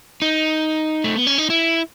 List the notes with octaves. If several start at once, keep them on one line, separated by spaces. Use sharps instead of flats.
D#4
A3
B3
C#4
D#4
E4